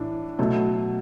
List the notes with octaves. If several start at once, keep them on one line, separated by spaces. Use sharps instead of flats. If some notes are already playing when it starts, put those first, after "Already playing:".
Already playing: A2 E3 D4
B2 F#3 A3